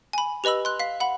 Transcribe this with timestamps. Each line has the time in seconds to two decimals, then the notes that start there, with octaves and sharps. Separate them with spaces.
0.13 G#5 B5
0.44 G4 B4 D#5 B5 E6
0.65 C6 F#6
0.80 F5 B6
1.00 F#5 B5